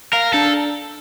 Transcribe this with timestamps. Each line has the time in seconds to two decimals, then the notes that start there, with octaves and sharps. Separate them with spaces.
0.13 A#4 F5
0.33 D4 A4